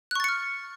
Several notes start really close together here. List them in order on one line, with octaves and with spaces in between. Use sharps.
F#6 C#6 A6 C#7 F6